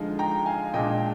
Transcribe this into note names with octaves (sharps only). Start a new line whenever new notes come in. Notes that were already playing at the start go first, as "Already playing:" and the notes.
Already playing: D3 F3 G#3 D#4
G5 A#5
F5 G#5
A#2 G#3 D4 D#5 G5